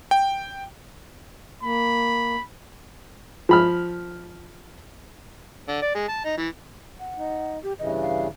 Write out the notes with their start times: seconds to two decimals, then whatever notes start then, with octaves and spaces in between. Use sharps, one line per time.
0.11 G5
1.63 A#3 B5
3.49 F3 B5 F6
5.68 D3
5.82 D5
5.95 G#3
6.09 A5
6.25 D#4
6.38 E3
6.99 F#5
7.18 D#4
7.63 G4
7.79 G2 C#3 E3 D#5
8.00 F5